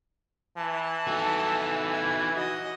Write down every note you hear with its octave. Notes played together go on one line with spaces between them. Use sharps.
E3 A5
D#4 F#4 A4
G#6
F#4 D#5